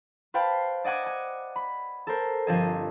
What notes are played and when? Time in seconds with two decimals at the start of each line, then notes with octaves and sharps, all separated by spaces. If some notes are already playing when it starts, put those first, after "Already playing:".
0.34 B4 C5 F5 G5 A5 B5
0.84 D5 D#5 F#5 G#5 D6
1.06 G#5
1.56 B5
2.07 A4 A#4 C5
2.47 G1 F3 C4 A4 D#5 G#5